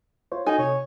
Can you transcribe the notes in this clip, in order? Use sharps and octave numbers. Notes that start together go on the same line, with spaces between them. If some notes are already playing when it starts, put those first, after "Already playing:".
F4 C5 C#5
D#4 F#4 A4 G#5
C3 C#5